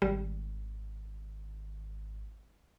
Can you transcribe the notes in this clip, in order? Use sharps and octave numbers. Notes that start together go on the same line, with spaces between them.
G#1 G3